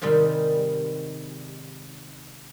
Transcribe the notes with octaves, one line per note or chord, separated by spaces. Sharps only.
G#2 C3 D#3 G3